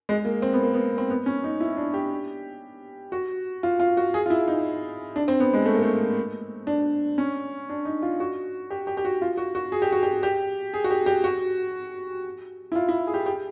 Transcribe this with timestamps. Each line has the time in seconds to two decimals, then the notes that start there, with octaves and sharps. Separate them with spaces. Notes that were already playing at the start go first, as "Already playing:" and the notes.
0.09 G#3
0.25 A#3
0.42 C4
0.53 B3
0.63 A#3
0.74 B3
0.98 C4
1.10 B3
1.26 C#4
1.44 D#4
1.60 E4
1.77 D4
1.94 G4
3.12 F#4
3.63 F4
3.80 F4
3.97 F#4
4.14 G#4
4.26 F4
4.30 E4
4.48 D#4
5.16 D4
5.28 C4
5.40 B3
5.54 G#3
5.65 A3
5.75 A#3
5.83 A3
6.67 D4
7.18 C#4
7.70 D4
7.85 D#4
8.02 F4
8.20 F#4
8.70 G4
8.87 G4
8.97 G4
9.05 F#4
9.22 F4
9.37 F#4
9.55 F#4
9.72 G#4
9.82 G4
9.92 F#4
10.03 G4
10.23 G4
10.74 G#4
10.84 F#4
10.90 G4
11.06 G4
11.24 F#4
12.72 E4
12.75 F4
12.88 E4
13.07 G#4
13.14 G4
13.26 G4